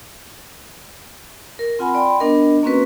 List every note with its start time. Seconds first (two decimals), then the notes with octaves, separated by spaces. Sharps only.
1.59 A#4
1.79 C4 F4 F#5 G#5 B5
1.95 D5 G5 B5 C6
2.20 B3 D4 A#4 D#5
2.63 A#3 C4 C#4 F#4 B4